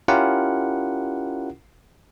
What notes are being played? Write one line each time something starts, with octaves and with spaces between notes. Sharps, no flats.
C#4 E4 F4 G4 A#4 F#5